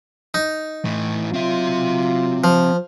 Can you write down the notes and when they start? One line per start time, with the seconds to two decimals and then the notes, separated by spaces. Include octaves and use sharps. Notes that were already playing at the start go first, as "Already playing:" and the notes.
0.34 D#4
0.85 A2 E3
1.33 F#3 C4 F4 E5
2.44 F3